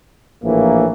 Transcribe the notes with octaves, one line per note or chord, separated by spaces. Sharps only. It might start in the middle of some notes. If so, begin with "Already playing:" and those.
A#1 A2 E3 A#3